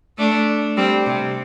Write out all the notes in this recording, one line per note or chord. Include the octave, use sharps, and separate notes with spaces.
A3 D4
G3 C4
C3